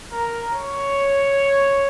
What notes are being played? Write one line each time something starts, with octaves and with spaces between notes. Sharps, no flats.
A#4
C#5